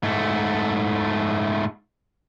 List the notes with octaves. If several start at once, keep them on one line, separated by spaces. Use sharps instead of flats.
G#2 A3